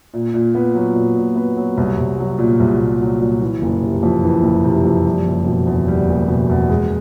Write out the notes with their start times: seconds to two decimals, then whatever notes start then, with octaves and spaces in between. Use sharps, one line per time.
0.14 A#2
0.34 A#2
0.55 B3
0.75 F#3
0.95 A#2
1.16 A#2
1.36 B3
1.57 F#3
1.77 C2
1.98 C2
2.19 F#3
2.39 A#2
2.60 C2
2.80 C2
3.01 F#3
3.20 A#2
3.42 E3
3.62 F#1
3.83 C3
4.03 F2
4.24 E3
4.43 F#1
4.65 C3
4.84 F2
5.05 G3
5.26 F#1
5.46 B2
5.67 E2
5.88 G3
6.08 F#1
6.28 B2
6.50 E2
6.70 G#3